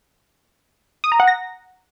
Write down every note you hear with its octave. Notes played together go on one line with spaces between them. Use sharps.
D#6
A#5
F#5
A#6